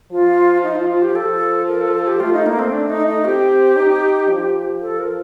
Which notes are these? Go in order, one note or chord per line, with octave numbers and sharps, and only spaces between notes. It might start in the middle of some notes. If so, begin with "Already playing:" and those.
F3 F4
D#4
F4
F4
G4
F3 A4
A#4
A4
A4
G4
A3 F4
D#4
A#3
C4
D4
D#4
D#4
C4 G4
D#4
F3
A4
A#4